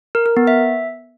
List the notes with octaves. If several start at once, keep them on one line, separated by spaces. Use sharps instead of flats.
A#4
A#4
B3
E5